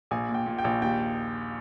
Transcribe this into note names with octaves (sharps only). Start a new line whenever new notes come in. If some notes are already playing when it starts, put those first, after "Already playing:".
A#1 G#5
A#2
G5
A#2
G5
A#1
D#2 G5